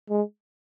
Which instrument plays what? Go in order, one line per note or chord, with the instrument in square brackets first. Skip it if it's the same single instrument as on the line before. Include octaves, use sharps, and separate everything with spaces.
[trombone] G#3